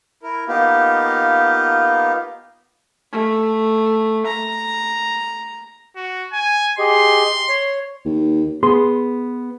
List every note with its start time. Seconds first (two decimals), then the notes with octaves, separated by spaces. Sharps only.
0.23 E4 A#4
0.48 A#3 B3 D#4 F4 G4
3.12 A3
4.26 A#5
5.96 F#4
6.33 G#5
6.79 G4 G#4 D#5 C6
7.49 C#5
8.05 D#2
8.63 B3 G#4 C6